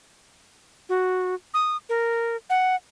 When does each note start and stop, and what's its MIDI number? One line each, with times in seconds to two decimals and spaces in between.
0.89 1.35 66
1.54 1.77 87
1.89 2.36 70
2.50 2.76 78